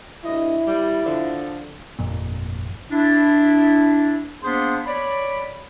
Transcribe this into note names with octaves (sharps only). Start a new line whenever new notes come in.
D2 G2 E4 D#5
G3
D3 F3
G1 F2 A#2
D4 E4
A#3 B3 D4 G#4 C5 C6
C#5 D5 B5